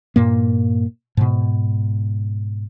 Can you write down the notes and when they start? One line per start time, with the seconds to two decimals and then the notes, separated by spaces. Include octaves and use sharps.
0.16 G2 A#2 A#3
1.17 G#2 B2